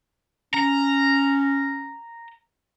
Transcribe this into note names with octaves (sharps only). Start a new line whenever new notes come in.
C#4 A#5